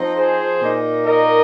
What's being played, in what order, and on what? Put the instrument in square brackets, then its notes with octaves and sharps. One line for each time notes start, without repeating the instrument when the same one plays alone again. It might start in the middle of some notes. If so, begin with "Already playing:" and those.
Already playing: [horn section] F3 C4 D#4
G#4 C5
A#2 A#3 D#4
A#4 D#5